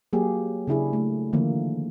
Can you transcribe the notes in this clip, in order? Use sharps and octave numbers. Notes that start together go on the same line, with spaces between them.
F#3 A#3 G4 G#4
C#3 D4 E4 G#4
A3
D3 D#3 F3 A#3